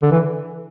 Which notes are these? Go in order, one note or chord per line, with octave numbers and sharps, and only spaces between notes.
D3
E3